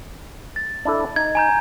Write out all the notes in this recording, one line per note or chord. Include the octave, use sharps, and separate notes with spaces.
A6
D4 E4 A4
D#4 G#6
G#5 A#5 G6